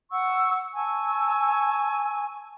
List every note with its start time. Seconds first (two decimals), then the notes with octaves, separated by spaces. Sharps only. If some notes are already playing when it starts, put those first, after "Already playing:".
0.12 F#5 C#6 E6
0.74 G#5 A5 C#6 E6